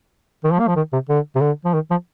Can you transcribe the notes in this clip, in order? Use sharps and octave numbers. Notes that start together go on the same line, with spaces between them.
D#3
F3
A#3
F3
D#3
C3
D3
C3
D3
F3
D#3
F3